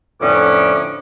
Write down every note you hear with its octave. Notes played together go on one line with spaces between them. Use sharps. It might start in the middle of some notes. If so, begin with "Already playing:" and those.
F2 A2 D3 B3 C#4 D6